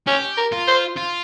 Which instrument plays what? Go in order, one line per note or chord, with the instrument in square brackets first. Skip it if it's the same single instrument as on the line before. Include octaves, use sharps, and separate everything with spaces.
[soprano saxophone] C#4 [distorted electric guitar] G4
[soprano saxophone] A#4
[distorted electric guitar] F4
[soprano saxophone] C5
[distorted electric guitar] F4